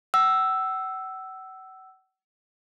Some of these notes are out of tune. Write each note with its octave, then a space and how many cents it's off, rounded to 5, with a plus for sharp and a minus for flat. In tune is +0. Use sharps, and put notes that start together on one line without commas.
F#5 +40 E6 +0